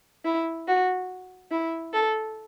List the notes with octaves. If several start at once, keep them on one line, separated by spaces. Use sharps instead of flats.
E4
F#4
E4
A4